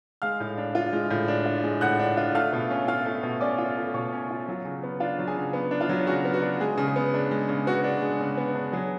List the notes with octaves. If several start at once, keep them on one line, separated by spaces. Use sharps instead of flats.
G#3 F5 F6
A2
D4
F4
G#3
A2
D4
F4
G#3
A2 F#5 F#6
D4
F4
A3 F5 F6
B2
C#4
F4 F5 F6
A3
B2
C#4 D5 D6
F4
A3
B2 C#5 C#6
C#4
F4
F#3
C#3
B3
D4 F4 F5
F#3
G#4 G#5
C#3
B3
D4
F4 F5
F#3
C#3 F#4
B3
F#4
D4
G#3 G#4
C#3
G#4
B3
D4
G#3
C#3
B3 F#4
D4
G#3
C#3
B3
D4
F#3 G#4